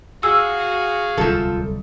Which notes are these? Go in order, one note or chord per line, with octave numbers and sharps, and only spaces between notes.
F#4 G#4 F5 E6
D1 C2 F3 A4